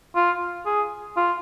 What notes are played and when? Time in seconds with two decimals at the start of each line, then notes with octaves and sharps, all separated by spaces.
0.15 F4
0.66 G#4
1.17 F4